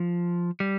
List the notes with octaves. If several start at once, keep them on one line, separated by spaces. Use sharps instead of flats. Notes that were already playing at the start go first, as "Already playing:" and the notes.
Already playing: F3
G3